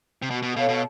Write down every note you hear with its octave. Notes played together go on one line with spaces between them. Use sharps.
C3
B2 F#4
B2
B2 A4 C#5 F5
B2